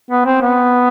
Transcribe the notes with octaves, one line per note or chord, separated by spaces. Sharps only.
B3
C4
B3